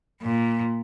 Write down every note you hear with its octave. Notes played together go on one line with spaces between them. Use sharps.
A#2